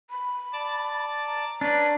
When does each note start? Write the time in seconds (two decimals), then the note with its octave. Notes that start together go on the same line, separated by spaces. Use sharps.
0.10 B5
0.53 D5 A5
1.26 A#5
1.61 C#4 D4 B4